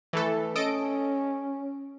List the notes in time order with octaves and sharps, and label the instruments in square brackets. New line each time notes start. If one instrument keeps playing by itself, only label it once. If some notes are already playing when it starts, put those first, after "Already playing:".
[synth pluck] E3 A3 A4
[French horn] C#4 [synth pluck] A4 D#5 D7